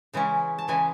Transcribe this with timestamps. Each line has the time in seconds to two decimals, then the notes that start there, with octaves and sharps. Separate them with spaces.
0.13 C#3 E3 G#3 C#4
0.58 A5
0.68 C#3 E3 G#3 G#5